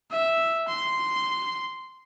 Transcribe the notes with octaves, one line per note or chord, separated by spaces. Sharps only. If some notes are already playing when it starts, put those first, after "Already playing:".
E5
C6